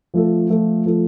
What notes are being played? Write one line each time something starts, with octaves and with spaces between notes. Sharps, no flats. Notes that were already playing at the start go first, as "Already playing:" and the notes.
F3 A3 F4 A4
F3 A3 F4 A4
F3 A3 F4 A4